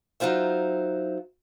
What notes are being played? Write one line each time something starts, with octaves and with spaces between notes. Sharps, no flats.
F#3 D#4 F4 C5 E5